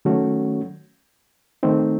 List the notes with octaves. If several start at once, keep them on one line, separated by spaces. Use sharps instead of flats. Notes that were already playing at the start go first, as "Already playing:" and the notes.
D#3 F#3 A3 C#4 F#4
D#3 A3 C4 D#4